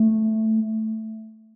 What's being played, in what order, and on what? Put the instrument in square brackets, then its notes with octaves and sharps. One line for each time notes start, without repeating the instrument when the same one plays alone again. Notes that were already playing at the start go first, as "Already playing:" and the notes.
Already playing: [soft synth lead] A3